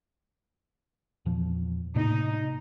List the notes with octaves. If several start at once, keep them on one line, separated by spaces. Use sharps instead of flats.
E2 A#2 F3
A2 C3 A#3 D#4